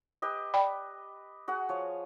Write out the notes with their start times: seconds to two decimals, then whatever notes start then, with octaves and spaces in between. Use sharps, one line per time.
0.22 G4 B4 D#5
0.54 D5 G5 B5
1.48 F#4 G#4 F#5
1.69 F3 C#5